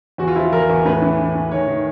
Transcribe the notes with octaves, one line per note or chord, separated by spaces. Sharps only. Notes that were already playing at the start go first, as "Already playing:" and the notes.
E2 F#4
F4
F3 E4
F4
E2 A#4
E2
A2 B4
E3
E3
A2
D#3 C#5
D#3